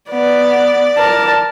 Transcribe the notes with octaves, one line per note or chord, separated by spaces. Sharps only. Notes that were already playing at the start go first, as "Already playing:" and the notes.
B3 D5
A#4 A5